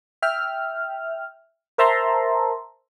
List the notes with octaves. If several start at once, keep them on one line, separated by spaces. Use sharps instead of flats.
E5 G5 F6
A#4 C5 E5 A5 A#5 C6